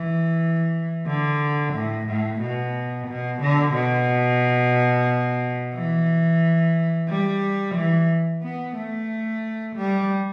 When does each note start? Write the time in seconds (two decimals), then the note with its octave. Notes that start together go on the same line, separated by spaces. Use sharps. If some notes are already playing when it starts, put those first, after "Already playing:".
Already playing: E3
1.07 D3
1.74 A2
2.07 A2
2.41 B2
3.08 B2
3.41 D3
3.74 B2
5.74 E3
7.09 G3
7.75 E3
8.43 B3
8.76 A3
9.76 G3